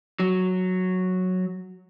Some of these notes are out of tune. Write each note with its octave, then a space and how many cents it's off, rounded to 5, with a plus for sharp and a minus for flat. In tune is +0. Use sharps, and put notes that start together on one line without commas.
F#3 -5